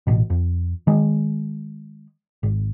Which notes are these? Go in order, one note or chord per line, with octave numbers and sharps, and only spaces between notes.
A1 B2
F2
D#3 G#3
G#1